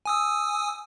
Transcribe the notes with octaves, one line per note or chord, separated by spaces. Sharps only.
G#5 D#6 E6